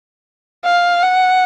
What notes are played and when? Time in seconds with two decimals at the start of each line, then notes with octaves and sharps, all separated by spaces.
0.65 F5
1.03 F#5